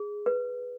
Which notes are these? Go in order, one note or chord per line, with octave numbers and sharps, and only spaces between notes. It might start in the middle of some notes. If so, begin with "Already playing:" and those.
Already playing: G#4
B4